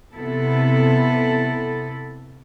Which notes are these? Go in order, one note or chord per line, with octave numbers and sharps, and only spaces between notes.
C3 B3 E4 A4